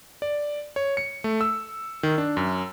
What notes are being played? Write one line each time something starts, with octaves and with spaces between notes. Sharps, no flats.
D5
C#5
C#7
A3
E6
D#3
D4
F#2